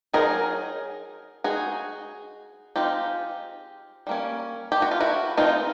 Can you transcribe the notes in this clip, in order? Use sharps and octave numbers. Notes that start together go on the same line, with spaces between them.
F#3 A#3 D#4 G#4 A#4
G#3 C4 D#4 F#4 G#4
F3 G#3 C4 D#4 F4 G4
G3 A#3 C#4
G4
F#4
F4
E4 F#4
E3 G#3 C4 D#4 F4